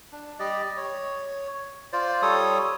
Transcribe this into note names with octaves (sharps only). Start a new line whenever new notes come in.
D4
G3 G4 D5 D#5
C#5
F4 C5 D5
G3 A4 C#5 D#6